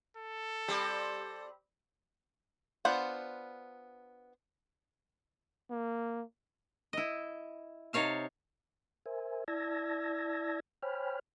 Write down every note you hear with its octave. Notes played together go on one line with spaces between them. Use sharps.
A4
G3 C4 G4
B3 D4 F4 C5 F#5
A#3
E4 D#5
C3 D#4 C#5 F5 A5
A#4 C5 E5 G#5
E4 D5 A5 E6 G#6 A#6
C5 C#5 G5 G#5 B5 F6